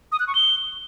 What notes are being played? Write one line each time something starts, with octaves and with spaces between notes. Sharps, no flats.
D#6
F#6
C#6
G7